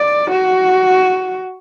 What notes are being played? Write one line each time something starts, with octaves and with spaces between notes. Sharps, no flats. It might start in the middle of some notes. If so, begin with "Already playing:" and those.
Already playing: D5
F#4